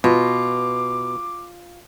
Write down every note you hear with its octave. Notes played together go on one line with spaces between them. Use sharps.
B2 F4 D6